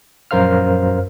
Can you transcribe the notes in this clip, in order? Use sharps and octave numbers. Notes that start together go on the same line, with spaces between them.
A#1 F#2 A#4 C5 F5 F6